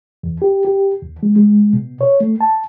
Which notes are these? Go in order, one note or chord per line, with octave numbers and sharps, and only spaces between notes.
E2
G4
G4
D#2
G#3
G#3
B2
C#5
A3
A5